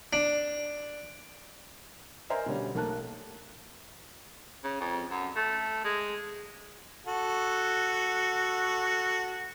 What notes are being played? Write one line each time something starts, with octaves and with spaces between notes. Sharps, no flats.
D4
A#4 C5 D#5 E5 G#5 A#5
B2 D3 G3 C#4
B1 A3 A#3 A5 F#6
C#3
F2
F#2
A3
G#3
F#4 A4